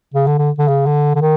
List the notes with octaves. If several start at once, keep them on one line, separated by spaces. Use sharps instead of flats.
C#3
D3
D3
D3
C#3
D3
D3
D#3